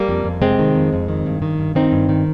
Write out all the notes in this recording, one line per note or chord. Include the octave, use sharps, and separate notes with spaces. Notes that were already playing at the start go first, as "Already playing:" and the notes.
Already playing: G3 A#3
F2
F2
C3 G#3 C4
D#3
F2
F2
D#3
G2
D#3
G2
D#3 C4 D#4
G2
D#3